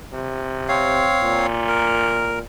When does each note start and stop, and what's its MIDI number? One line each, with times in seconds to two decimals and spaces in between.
0.13 1.03 48
0.68 1.47 60
0.68 1.47 73
0.68 1.47 77
1.23 2.42 46
1.68 2.39 70